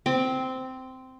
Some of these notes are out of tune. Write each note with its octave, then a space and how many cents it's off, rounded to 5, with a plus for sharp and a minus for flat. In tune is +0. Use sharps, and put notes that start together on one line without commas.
C4 -10 D6 +15